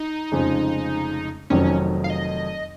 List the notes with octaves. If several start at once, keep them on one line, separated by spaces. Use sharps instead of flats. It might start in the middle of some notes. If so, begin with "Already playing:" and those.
Already playing: D#4
F1 F2 C#3 G#3
F1 F2 D#3 F#3 C#4
F5
D#5